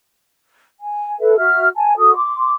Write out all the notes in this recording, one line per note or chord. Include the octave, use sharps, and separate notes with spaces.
G#5
A4 B4 E5
F#4 E5 F6
G#5 A5
F#4 A4 D#6
C6 D6